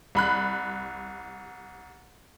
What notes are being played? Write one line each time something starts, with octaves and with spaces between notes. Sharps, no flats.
C2 B5 F#6